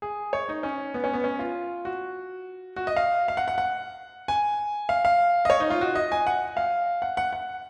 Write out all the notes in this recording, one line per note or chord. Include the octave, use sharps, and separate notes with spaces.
G#4
C#5
D#4
C#4
B3
C#4
B3
C#4
F4
F#4
F#4
D#5
F5
F5
F#5
F#5
F#5
G#5
F5
F5
D#5
C#5
D#4
F4
F#4
D#5
G#5
F#5
F5
F#5
F#5
F#5